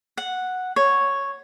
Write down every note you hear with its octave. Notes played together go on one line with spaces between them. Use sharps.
F#5
C#5